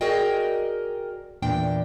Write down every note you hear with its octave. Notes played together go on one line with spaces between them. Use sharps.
F#4 G#4 A#4 D5 D#5 G5
E2 A#2 D4 G5